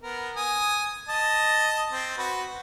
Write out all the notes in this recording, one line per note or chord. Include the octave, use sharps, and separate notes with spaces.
B3 A#4
G#5 D#6
D#5 A5
C4
F#4 B4